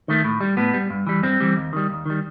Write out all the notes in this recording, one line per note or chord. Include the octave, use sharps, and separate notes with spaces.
D#3 A3
A2
G3
A2 B3
G3
G2
E3 G3
G2 C4
E3 G3
D#2
D#3 G3
D#2
D#3 G3